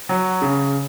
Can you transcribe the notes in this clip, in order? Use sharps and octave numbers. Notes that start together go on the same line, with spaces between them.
F#3
C#3